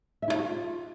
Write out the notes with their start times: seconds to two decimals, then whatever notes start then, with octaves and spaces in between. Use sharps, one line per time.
0.22 E5
0.28 E4
0.33 F5
0.39 F#4
0.44 F4